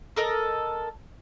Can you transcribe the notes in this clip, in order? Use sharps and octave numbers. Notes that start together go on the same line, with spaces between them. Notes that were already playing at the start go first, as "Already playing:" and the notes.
A4 A#4 D#5